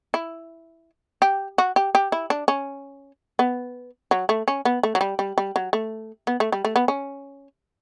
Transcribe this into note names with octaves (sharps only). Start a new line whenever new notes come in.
E4
G4
F#4
G4
G4
E4
D4
C#4
B3
F#3
A3
C#4
B3
A3
F#3
G3
G3
G3
F#3
A3
B3
A3
G3
A3
B3
C#4